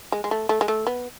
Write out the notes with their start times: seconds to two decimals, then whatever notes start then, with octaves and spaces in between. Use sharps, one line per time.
0.12 G#3
0.24 G#3
0.31 A3
0.49 A3
0.61 G#3
0.68 A3
0.87 B3